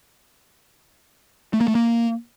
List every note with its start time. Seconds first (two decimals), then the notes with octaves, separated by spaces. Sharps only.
1.53 A3
1.61 A#3
1.68 A3
1.75 A#3